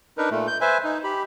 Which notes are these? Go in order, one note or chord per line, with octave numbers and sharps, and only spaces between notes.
D4 D#4 A#4 B4
A#2 A3
G6
B4 C5 E5 G#5
D#4
G4 B5